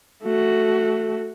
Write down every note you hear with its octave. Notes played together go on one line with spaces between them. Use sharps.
A3 F#4